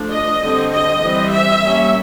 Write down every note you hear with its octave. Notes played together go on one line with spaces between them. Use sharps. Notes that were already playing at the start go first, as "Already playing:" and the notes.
Already playing: F3 A3 D4
D#5
D3 G3 C4
D#5
E3 G3 C4
E5
G3 A#3 C#4